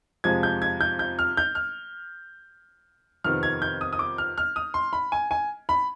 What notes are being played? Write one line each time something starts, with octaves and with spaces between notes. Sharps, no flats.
F2 C3 F3 G#3 G#6
G6
G#6
G6
G6
F6
G6
F6
F2 C3 D#3 B3 F6
G#6
G6
D#6
D#6
D6
F6
F6
D#6
C6
B5
G#5
G#5
B5